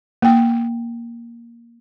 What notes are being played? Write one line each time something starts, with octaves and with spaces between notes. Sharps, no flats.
A#3 G5